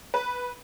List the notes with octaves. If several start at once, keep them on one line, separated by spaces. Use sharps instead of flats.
B4